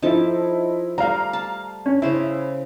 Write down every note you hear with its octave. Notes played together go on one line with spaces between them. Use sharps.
F3 D#4 E4 A4 A5
G3 A3 F5 A#5
A5
C#4
C#3 E4 C5